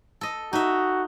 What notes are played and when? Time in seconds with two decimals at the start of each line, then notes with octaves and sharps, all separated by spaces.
0.21 A4 D#5
0.53 D#4 F#4 E5